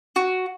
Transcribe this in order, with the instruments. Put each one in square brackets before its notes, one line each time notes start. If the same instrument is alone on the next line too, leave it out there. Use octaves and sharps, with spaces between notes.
[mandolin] F#4